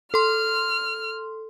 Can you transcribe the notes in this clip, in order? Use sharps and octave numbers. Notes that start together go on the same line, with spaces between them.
A4 C6 F6